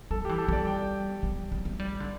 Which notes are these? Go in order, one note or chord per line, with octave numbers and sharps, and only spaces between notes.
G3 A4
G4
E3
A4
G3 D5
G5
G3
G3
A3
G3 D5
D3